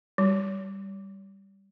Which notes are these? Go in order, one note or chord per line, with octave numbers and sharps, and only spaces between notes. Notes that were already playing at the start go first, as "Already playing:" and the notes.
G3